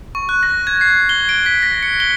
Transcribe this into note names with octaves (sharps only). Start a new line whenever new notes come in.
C#6
F#6
A#6
G#6
C7
G7
D7
B6
A#6
C#7
G7